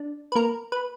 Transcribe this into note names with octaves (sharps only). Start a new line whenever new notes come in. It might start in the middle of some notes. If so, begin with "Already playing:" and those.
Already playing: D4
B4
A#3 A#4
B4